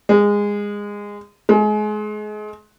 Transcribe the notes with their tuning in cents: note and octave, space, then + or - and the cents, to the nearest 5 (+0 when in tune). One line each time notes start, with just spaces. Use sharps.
G#3 -20
G#3 +30